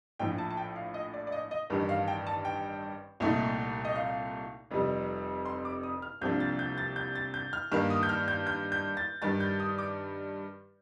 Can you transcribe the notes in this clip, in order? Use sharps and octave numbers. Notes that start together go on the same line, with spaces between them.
A#1 A2 F3 G5
A5
A5
G5
F5
D#5
D5
D5
D#5
D#5
A1 G2 D#3 G3
F5
G5
A5
G5
C2 A#2 A3 D#4
D#5
F5
F1 F2 C3 G3
C6
D6
D#6
F6
C2 C3 F3 A#3 D4 G6
A6
G6
A6
G6
A6
G6
F6
G2 D#3 A#3 F6
D#6
G6
F6
G6
G6
G6
A6
G2 D#3 G3 A6
G6
D#6
D6